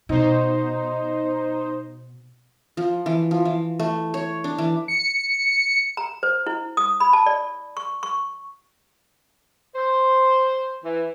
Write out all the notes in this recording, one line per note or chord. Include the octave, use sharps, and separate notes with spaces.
B2 D#4 C5
F3
E3
F3
E3
A3
C#5
D4
E3
C#7
A#5
C5
E4
D#6
B5
A5
D5
C#6
C#6
C5
E3